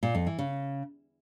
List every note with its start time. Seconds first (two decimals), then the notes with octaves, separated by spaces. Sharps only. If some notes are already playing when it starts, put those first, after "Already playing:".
0.03 A#2
0.15 F2
0.27 E3
0.38 C#3